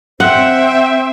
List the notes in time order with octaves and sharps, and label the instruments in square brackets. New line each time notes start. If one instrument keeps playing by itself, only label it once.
[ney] C4 [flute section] C5 G5 [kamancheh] E5 [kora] F#5